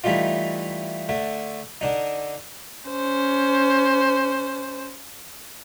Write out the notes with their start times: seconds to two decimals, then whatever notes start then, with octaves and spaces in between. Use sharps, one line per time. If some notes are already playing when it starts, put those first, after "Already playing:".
0.04 E3 G3 A3 D#4 F4
1.09 D3 A3
1.81 D3 D4 D#4
2.90 C#4 C5